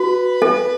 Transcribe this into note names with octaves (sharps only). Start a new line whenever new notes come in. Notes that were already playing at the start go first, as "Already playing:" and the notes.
Already playing: F#4 B4
A4